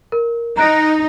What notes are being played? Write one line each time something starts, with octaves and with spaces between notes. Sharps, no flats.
A#4
D#4 A#5 F#6 D7